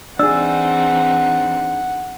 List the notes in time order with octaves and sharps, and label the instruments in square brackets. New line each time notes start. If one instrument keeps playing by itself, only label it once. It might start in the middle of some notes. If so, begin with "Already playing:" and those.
[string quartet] E3 C4 D#4 [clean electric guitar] D4 G#4 [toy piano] D5 E6 [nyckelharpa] F#5